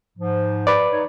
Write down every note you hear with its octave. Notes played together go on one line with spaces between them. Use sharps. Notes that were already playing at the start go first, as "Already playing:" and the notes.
G#2 F3
B4 D5
D#4 C#5